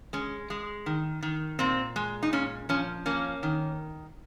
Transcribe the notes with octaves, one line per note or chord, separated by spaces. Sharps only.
G#3 C#4
G#3
D#3
D#3
A#2 C4
G#3
D#4
A#2 C#4
F3 C#4
A#3 C#4
D#3